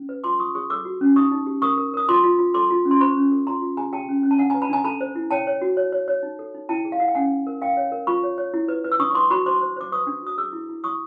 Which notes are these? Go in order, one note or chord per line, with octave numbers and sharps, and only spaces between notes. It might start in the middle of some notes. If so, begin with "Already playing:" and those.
Already playing: C#4
B4
F4 C6 D6
F4 C#6 D#6
G#4 C#6 D#6
A4 D6 E6
F#4
C#4
D#4 C#6 D#6
D#4
G4
A#4 C#6 D#6
A#4
A#4 D#6
F4 C6 D6
F4
F4
A4 C6 D6
F4
C#4
C6
C5 B5 C#6
C#4
A4
F4 A#5 C6
F4
G#4 G#5 A#5
G4 G5 A5
C#4
C#4
A5
D4 F#5 G#5
B4 G#5 A#5
A5 B5
D4 G#5 A#5
A4 A5 B5
C5
E4
C#5 G5 A5
C#5
F#4
C#5
C#5
C#5
D#4
A4
D#4
E4 G5 A5
G#4
F5
E4 F#5
G5
C#4 F#5 G#5
C#4
A#4
A#4 F5 G5
C#5
A#4
F4 B5 C#6
C#5
C#5
E4
B4
B4
E6
D4 C#6 D#6
C#6
B4 C6 D6
F#4 B5 C#6
C5 C6 D6
C5
C5 D6
B4 C#6 D#6
D4
F#4 D#6
G#4 D6 E6
E4
E4
E4 C#6 D#6